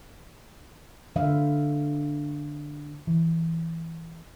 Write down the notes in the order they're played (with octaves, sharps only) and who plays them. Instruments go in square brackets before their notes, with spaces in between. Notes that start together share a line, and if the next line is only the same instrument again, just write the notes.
[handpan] D3 E5 F5
[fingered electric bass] E3